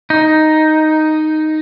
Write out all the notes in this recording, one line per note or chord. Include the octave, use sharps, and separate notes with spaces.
D#4